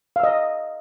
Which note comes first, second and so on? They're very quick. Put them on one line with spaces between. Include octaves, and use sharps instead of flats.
F5 E6 D#5